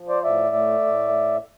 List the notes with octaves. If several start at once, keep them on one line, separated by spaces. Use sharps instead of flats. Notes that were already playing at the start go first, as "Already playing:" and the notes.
Already playing: F3
C5 D5
A2 D5 E5
A3
A2